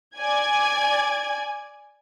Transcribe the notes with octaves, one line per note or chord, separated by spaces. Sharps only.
D5 G#5 G#6